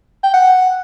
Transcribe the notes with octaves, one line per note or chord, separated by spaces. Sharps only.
G5
F#5